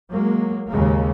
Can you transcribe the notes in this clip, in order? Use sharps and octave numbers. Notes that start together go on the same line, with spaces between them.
F#3 G#3 A#3
D#2 G#2 C#3 G#3 A#3